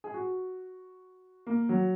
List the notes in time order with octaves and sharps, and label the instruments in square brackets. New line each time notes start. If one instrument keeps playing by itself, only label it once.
[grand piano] G#4
F#4
A#3
F#3